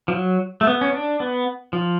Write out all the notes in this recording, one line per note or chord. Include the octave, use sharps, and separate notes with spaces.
F3
F#3
A3
B3
C#4
D4
B3
F3